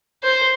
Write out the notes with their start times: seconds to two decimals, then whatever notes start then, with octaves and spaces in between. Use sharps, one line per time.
0.23 C5